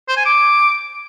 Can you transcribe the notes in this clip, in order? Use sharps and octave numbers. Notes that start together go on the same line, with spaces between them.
C5
G#5
D6